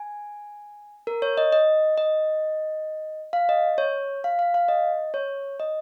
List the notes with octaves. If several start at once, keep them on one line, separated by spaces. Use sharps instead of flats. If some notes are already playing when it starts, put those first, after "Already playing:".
Already playing: G#5
A#4
C#5
D#5
D#5
D#5
F5
D#5
C#5
F5
F5
F5
D#5
C#5
D#5